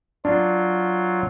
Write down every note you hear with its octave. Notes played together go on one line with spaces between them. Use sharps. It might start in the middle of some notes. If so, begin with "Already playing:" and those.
F#3 D4 F4